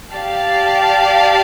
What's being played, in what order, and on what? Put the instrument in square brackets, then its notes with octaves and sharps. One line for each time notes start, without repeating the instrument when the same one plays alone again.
[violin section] G4 D5 F5 A5